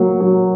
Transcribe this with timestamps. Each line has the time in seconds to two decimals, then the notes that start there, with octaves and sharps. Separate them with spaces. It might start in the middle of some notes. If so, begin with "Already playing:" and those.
Already playing: F#3 A#3
0.20 F#3